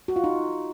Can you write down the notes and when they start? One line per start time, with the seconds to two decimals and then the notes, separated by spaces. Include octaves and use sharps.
0.08 F#4
0.16 F4
0.24 D#4